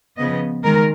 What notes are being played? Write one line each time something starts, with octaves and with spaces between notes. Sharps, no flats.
C#3 F3 B3 D#5
D#3 G#3 A#4